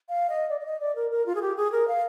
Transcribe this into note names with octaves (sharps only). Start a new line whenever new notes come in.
F5
D#5
D5
D5
D#5
D5
A#4
A#4
F4
G#4
G4
G#4
A#4
F5